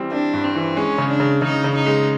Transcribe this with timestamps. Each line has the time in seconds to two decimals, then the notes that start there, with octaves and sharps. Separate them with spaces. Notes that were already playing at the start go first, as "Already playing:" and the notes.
Already playing: E3 G3 C4
0.12 C4 D4
0.34 G2
0.44 C4
0.56 E3
0.76 G#3 C#4
0.98 C#3
1.10 D4
1.20 C#3
1.42 C#3 D#4
1.64 C#3
1.75 D#4
1.86 G#3